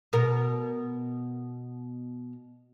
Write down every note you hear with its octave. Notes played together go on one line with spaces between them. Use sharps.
B2 A#4